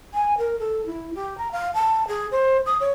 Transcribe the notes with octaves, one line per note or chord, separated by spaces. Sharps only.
G#5
A#4
A4
E4
G4
A#5
F5
A5
G#4
C5
D#6
C#5